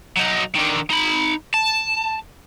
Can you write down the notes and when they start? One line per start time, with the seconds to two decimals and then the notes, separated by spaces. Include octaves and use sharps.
0.17 F#3 D#4
0.55 D3 D#3
0.90 D#4 B5
1.54 A5